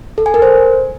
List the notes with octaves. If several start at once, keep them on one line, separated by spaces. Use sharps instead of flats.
A4
G#5
A#4
C5